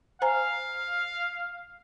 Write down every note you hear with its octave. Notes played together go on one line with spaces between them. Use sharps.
C5 F5 G#5 A#5